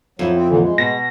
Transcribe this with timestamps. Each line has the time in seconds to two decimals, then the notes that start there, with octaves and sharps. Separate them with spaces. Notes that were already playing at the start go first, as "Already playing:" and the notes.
0.19 F2 F#3 E4
0.35 C4
0.49 A#2 D3 E3
0.62 G#3
0.78 B2 A#6